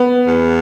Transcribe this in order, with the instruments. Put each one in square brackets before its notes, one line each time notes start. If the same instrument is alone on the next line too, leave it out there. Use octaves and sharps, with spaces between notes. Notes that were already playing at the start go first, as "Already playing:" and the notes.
Already playing: [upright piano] B3
[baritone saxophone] E2